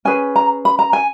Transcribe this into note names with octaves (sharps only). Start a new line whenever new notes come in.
C#4 G#4 B4 G#5
A#5
B5
A#5
G#5